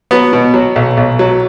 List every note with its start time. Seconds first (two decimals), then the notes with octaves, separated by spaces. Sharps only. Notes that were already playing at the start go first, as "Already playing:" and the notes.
0.11 F#3 B3
0.33 B2
0.54 F#3
0.76 B1
0.97 B1
1.19 F#3